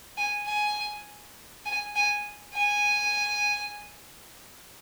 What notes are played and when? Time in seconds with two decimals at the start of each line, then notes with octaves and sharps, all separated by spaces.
0.17 G#5
0.46 G#5
1.65 G#5
1.96 G#5
2.54 G#5